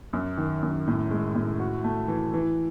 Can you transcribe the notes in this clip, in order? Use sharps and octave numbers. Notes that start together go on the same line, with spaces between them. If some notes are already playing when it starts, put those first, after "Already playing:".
F#2
D#3
F#2
A2
G#3
A2
F#4
A3
E3
E3